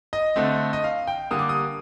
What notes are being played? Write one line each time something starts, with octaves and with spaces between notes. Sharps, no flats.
D#5
D3 A3 C4
D#5
F5
G5
D3 G3 A#3 D#6
D6
D#6